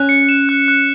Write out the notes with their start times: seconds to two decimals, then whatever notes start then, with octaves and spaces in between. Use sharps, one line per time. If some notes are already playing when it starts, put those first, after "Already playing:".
Already playing: C#4 F#6
0.09 C#7
0.29 E7
0.49 F#6
0.68 F#6